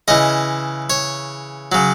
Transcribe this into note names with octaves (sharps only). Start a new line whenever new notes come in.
C#3 E3 D#5
C#5
C#3 F#3